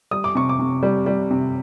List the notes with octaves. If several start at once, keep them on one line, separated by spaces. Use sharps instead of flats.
G3 D#6
D6
C3 C#6
D6
C3
G3
G3
C3